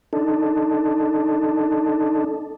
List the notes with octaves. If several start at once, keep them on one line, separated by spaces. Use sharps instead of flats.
D4 D#4 A4